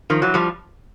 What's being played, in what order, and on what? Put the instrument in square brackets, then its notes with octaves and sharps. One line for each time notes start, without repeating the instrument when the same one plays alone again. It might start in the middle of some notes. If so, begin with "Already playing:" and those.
[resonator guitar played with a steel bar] D#3 F3
E3 F#3
F3 G3